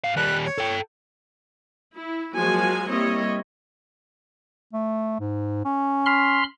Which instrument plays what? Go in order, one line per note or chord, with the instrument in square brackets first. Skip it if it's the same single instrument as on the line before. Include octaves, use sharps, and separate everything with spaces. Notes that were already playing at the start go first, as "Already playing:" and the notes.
[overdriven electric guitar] G#2 F5
[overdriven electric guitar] D#2 G3 [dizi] F#6
[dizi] C#5
[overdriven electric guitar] A4 G5
[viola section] E4
F3 F#3 G#3 A#3 F#4 G#5
G3 A#3 C4 E4 C#5 D#5
[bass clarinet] A3
G#2
C#4
[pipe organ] B5 C6 F6